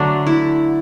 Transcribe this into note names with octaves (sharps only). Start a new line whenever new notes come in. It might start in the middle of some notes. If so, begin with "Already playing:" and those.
Already playing: D3 F#3 A3 D4
E4